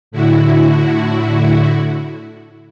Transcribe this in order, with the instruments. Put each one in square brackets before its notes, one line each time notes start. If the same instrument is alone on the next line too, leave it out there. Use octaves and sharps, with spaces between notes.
[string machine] A2 D3 E4 F#4